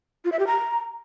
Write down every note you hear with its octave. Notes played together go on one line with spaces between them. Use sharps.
F4
E5
G4
A#5